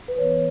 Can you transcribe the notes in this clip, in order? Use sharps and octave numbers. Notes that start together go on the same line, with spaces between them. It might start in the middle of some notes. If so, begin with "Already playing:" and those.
B4
E3 B3 C#5